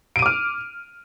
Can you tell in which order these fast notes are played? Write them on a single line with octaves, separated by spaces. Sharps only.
D7 D#7 D6 F6